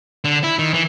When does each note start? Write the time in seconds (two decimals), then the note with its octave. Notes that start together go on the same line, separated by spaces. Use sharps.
0.24 D3
0.43 E4
0.59 D#3
0.74 E3